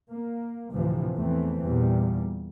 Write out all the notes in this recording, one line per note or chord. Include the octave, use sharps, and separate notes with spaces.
A#3
D2 A2 C3 E3 F3
E2 E3 A3 C4
E2 A#2 G3